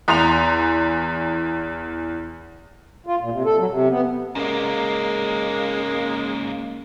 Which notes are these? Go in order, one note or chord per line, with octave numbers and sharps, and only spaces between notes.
E2 A#5 C6 F7
F4
A#2
C3
A4
F#3
C3
B3
G#2 C#3 G#3 A#3 A#4